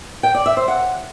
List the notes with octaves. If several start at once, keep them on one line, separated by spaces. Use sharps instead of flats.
G5
D5
E5
C5
F#5